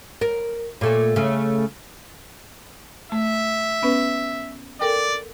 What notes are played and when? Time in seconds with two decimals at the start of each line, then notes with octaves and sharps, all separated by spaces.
0.21 A#4
0.81 A#2 A3 A4
1.16 C#3 A3
3.12 A3 E5
3.83 B3 C#4 B4
4.81 A4 A#4 D5 G5